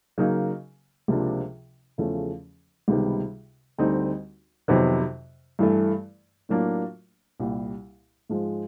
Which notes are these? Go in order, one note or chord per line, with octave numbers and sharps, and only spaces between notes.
C#3 F#3 A#3 D#4
C#2 C3 F3 A#3 D4
E2 C#3 F3 A3 C#4
C#2 C3 D#3 G3 B3
D2 D3 G3 C4 D#4
F2 C3 D#3 F#3 B3
G2 E3 A3
A2 F#3 A#3 D4 F4
C2 A#2 G3
G#2 F3 G#3